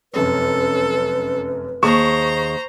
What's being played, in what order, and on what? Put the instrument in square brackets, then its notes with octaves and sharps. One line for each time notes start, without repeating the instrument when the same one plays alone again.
[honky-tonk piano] F1 F#2 C#5 [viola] A4 [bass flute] B4
[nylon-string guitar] D#2 G#4 A5 [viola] C5 A#5 [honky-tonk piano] C#6